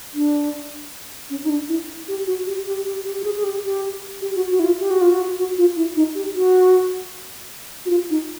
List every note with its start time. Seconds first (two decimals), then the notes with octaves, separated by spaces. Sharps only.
0.14 D4
1.30 C#4
1.44 D#4
1.50 D4
1.69 E4
2.08 G4
2.27 F#4
2.47 G4
2.66 G4
2.85 G4
3.05 G4
3.20 G4
3.24 G#4
3.37 G#4
3.44 G4
3.64 G4
4.22 G4
4.36 F#4
4.51 F#4
4.59 E4
4.65 F4
4.80 G4
4.91 F#4
5.01 F4
5.12 F#4
5.38 F#4
5.58 F4
5.76 E4
5.96 D#4
6.15 G4
6.35 F#4
7.86 F#4
7.90 F4
8.10 D#4